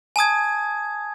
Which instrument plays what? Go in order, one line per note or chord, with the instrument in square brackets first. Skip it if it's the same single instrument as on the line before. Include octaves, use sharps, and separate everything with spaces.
[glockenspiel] G#5 A5 D#6 G#6